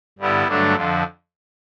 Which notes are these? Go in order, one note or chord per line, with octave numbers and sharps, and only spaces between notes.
G2 D3 G3 B3 E4
G2 D3 F#3 A3 D4
F2 D3 F3